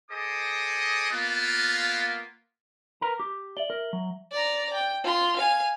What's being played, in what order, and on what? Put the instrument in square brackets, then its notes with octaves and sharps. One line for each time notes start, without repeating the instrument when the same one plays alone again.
[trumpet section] G#4 A4 C5 D#5 D6 D#6
A#3 B3 F4
[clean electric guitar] A#4 B4 A#5
G4
[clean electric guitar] D5 [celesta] E5 F#7 G7
[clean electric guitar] A#4
F#3
[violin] D5 A#5
G5
F4 C6
F5 G#5